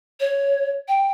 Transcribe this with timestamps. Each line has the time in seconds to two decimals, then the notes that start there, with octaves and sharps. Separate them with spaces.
0.20 C#5
0.88 G5